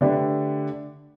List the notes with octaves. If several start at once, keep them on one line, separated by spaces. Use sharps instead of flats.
D3 A3 D4 G4 B4